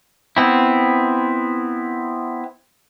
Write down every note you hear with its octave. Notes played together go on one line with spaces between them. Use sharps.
B3 C4 E4